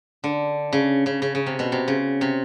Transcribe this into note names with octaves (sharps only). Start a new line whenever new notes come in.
D3
C#3
C#3
C#3
C#3
C3
B2
C3
C#3
C3